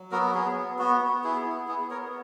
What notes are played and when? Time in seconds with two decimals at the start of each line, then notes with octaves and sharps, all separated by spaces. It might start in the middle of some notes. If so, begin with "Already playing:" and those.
Already playing: F#3
0.11 B3 F#4 A#4
0.35 B3 G#4
0.56 B3
0.79 B3 F#4
1.01 B3
1.24 E4 G#4
1.46 E4
1.68 B3 G#4
1.90 B3 A#4 C#5